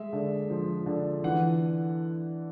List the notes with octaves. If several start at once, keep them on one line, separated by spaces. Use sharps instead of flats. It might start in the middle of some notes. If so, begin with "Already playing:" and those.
Already playing: G#3 E5
D3
F3
D3
E3 F#5